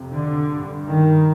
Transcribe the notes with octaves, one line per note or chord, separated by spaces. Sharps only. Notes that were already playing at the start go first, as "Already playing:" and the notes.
Already playing: F2 C3
D3
G2
D#3